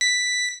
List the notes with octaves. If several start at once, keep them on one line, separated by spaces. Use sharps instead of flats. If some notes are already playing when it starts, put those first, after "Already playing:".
B6